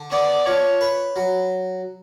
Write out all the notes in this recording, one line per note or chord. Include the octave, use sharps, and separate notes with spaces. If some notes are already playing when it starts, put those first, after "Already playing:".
Already playing: D3
B3 D5
F3 C#5
B4
F#3